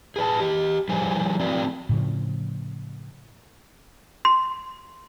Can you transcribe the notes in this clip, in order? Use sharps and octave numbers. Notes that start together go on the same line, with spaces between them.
G#4 B4 A5
G4 D#5
F3 G3 G#4 B4 C5 G#5
A3 C4 F#4 D5
A2 C#3 F3
C6